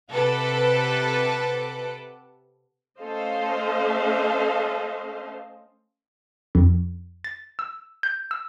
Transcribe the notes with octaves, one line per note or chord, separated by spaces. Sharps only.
C3 A4 B4 F#5 D6
A3 C#4 A4 C5 D#5 F5
F2
A6
E6
G6
E6